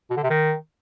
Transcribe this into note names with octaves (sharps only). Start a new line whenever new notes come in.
B2
D3
C3
D#3